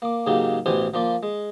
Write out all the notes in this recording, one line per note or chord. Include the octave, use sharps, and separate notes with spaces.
A#3 D6
G#2 C#3 F#3 A#3 G4
A1 B2 E3 G4 C5 G#5
F3 A#3 F4 D5
G#3